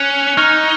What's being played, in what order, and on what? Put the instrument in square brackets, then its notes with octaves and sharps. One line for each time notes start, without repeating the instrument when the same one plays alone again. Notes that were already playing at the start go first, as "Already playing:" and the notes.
Already playing: [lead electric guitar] C#4 [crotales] F#6 C#7 F7
[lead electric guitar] D#4 [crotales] C#6 F6 G#6 C#7